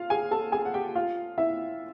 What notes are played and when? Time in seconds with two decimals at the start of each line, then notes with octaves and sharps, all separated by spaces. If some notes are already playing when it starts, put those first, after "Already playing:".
Already playing: F4 F5
0.10 G#4 G#5
0.31 A4 A5
0.52 G#4 G#5
0.65 F#5
0.74 G4 G5
0.95 F4 F5
1.38 E4 E5